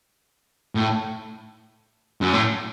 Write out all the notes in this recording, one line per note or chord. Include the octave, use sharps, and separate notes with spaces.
A2
F#2
A2